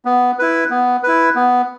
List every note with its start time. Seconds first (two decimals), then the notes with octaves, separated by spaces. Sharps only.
0.05 B3
0.39 E4 B4
0.70 B3
1.03 E4 B4
1.36 B3